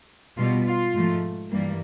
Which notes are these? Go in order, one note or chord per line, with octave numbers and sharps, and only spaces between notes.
B2 G3 B3 F4
F4
G#2 F3 A3
G2 E3 G3 A#3